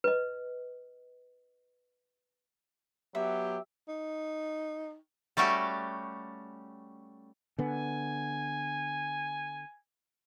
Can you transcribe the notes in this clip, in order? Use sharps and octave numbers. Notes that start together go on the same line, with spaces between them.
B4 D#5
F#3 B3 G4 E5
D#4
G3 A3 C#4 F#4 G4
D3 B3 G#5